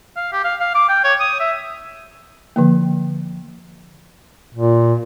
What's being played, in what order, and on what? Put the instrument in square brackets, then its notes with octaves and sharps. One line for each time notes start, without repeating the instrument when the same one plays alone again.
[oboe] F5
G4
F5
F5
D6
G5
C#5
D#6
E5
[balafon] D3 F3 A#3
[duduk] A#2